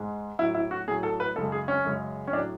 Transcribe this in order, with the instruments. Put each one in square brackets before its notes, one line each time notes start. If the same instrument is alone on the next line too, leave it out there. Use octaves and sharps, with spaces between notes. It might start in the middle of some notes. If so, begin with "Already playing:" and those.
Already playing: [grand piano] G#2 G#3
A2 F#3 E4
E4
F#4
A2 F#3 G#4
A4
B4
F#2 C#3 G#3 A4
G#4
C#4
F#2 C#3 G#3
C#4
A2 D4
F#3